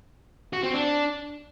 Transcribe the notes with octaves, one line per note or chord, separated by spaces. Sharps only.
F#4
C4
D4